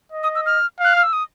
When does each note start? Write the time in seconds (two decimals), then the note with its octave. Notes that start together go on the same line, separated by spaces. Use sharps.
0.12 D#5
0.23 D#6
0.35 E6
0.46 F6
0.79 F5
0.84 F#6
0.93 F6
1.03 E6
1.13 D#6